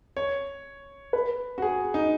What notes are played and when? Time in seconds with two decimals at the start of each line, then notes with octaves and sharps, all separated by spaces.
0.17 C#5
1.13 B4
1.58 F#4
1.62 G#4
1.94 D#4